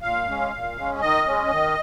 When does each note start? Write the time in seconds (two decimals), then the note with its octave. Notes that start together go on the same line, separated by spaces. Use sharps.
0.02 A#2 F5
0.27 G#3 C#4
0.52 A#2
0.76 G#3 C#4
1.01 D#3 D#5
1.26 G#3 C#4
1.51 D#3